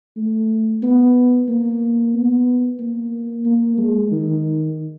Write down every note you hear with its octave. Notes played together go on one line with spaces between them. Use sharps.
A3
B3
A#3
B3
A#3
A#3
G#3
D#3